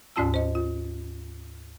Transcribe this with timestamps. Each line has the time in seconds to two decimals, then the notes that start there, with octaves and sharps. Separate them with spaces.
0.16 D2 G#2 C#4 F4 A5 E6
0.34 C5 D#5
0.55 F4